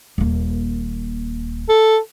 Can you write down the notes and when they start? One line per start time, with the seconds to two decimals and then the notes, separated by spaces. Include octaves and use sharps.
0.18 D#1 A#3
1.69 A4